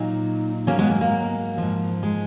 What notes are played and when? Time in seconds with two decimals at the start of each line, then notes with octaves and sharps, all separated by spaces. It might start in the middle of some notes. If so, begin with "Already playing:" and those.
Already playing: A#2 F#3 D#4
0.67 G#2 F#3 A#3 C#4
0.79 G#3 B3
0.90 A#3
1.01 A#3
1.58 G#2 F3
2.03 G#3